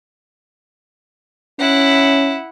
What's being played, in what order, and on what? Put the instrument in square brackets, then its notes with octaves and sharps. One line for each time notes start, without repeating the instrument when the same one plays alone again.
[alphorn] C#4 [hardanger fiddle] E4 F#5